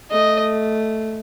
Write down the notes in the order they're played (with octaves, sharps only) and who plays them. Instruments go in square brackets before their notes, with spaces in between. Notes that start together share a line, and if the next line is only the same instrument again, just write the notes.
[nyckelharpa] A3 [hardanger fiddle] D#5